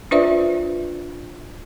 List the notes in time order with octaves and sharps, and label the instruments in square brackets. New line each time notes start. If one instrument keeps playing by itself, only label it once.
[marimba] D4 F4 B4 C5 D5 E5